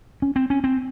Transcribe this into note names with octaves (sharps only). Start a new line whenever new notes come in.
C#4
C4
C#4
C4